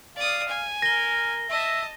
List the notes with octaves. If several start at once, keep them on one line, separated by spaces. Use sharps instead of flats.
D5 F5 D#6
G#5
A#4 A#6 G7
D#5 E5 A5